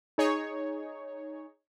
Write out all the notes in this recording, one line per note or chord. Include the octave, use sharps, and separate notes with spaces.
D#4 G#4 C#5